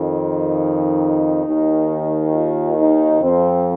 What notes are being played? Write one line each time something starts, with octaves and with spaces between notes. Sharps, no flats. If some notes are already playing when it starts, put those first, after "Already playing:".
Already playing: F2 D#3
D#4
D#2 D#3
F4
D#4
F2 F3 C4